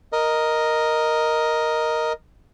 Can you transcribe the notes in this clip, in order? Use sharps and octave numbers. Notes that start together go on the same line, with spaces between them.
A#4 D#5